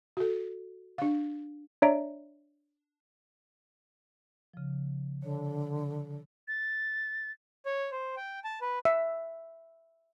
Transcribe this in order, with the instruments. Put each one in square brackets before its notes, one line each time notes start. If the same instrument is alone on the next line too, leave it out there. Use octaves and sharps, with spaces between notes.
[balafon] F#4 A4
D4 F5
[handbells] D4 C#5 D5 E5 A#5 D7
[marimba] C#3 F3
[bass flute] D3 [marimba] C#5
[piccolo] A6
[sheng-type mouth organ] C#5
C5
G5
A5
B4
[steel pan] E5